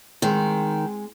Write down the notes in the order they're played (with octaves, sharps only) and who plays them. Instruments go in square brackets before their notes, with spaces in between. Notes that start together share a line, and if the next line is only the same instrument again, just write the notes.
[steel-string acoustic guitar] D#3 [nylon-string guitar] G#3 C4 C5